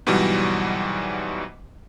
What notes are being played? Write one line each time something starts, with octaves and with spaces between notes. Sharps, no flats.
G#2 B2 E3 F#3 G3